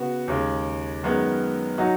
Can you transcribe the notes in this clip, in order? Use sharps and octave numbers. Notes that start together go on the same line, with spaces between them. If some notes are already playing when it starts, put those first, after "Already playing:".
Already playing: C#3 B3 F#4
D#2 C#3 G#3
F#2 D#3 G#3 B3
F#3 D#4 F#4